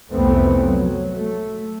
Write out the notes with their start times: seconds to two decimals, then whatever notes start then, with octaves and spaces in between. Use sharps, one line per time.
0.12 C2 F2 E3 A3 B3 C4
0.64 F#3
1.11 A3